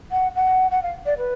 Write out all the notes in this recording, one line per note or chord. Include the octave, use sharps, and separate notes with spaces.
F#5
F#5
F#5
F5
D5
B4